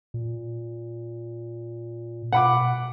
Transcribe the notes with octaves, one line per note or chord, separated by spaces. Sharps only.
A#2
B2 F#5 B5 D6